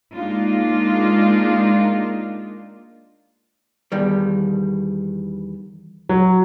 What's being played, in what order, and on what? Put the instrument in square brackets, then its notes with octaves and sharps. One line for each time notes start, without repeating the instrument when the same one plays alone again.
[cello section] G#3 A#3 D4 D#4 F4
[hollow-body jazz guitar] E2 D#3 G3
[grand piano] F#3